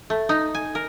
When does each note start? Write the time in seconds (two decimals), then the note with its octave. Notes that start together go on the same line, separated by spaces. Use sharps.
0.10 A3
0.29 D#4
0.55 G#5
0.75 A#4